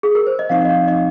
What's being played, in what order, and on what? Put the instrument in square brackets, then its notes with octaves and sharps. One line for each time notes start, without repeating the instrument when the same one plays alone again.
[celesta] G#4
A#4
C5
D#5
[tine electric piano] F3 C4 D#4 [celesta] F5
[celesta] D#5
F5
[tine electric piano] F3 C4 D#4 [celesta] D#5